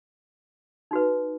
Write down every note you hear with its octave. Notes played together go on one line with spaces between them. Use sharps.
D#4 F#4 B4